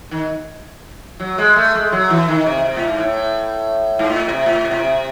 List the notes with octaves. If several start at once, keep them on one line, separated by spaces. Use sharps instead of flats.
D#3
F#3
G#3
A3
G#3
F#3
E3
D#3
C3
C3
A2
G#2
A2
G#2
A2
C3
A2
C3
A2
C3